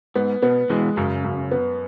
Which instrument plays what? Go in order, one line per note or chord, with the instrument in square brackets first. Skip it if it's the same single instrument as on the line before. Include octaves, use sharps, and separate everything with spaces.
[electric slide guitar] G#2 [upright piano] B3
[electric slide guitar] B2 [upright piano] B3
[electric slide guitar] B2 E3 [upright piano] G#3
[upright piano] F#2 [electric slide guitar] C#3
[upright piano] F#2
B3